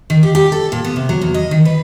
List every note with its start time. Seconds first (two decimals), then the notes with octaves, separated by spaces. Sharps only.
0.10 D#3
0.23 G4
0.35 G4
0.52 A4
0.72 A#2
0.84 B3
0.96 C3
1.09 F#3
1.21 E2
1.34 D#5
1.51 D#3
1.65 B4